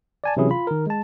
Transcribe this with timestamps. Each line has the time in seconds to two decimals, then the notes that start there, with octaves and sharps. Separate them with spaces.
0.24 D5 G#5 A5
0.37 C3 E3 F#3 C#4 E4 G#4
0.51 F4 B5
0.67 D#3 A#4
0.87 G#3 A5